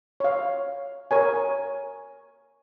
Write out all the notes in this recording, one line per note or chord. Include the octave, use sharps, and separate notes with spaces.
C#5 F5
A#4 C#5 G#5